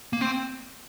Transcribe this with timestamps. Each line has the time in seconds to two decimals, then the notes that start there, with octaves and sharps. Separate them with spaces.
0.13 A#3
0.21 C4